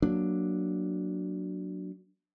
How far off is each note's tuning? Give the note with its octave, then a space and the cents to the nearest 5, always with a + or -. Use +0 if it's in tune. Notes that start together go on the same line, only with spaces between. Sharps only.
F#3 +0 A#3 +0 D4 +0